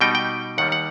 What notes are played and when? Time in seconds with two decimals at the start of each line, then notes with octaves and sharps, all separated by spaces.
0.01 B2 G3 D#4 G5
0.15 G5
0.58 D#2 D#3 G3 F#5
0.72 F#5